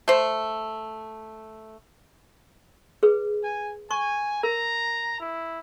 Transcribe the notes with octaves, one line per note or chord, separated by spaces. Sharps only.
A3 C5
G#4 B4
G#5
G#5 C#6
A#4 A#5
E4